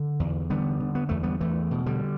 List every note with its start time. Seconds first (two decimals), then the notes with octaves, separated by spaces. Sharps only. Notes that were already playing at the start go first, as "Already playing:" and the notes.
Already playing: D3
0.20 E2
0.50 D3 G3 B3
0.80 D3
0.95 B3
1.09 E2 A3
1.23 G3 B3
1.40 E2 E3 A3
1.71 B2
1.86 D3 G3